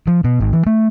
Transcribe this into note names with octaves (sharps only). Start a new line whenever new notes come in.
F3
B2
G#1
E3
A3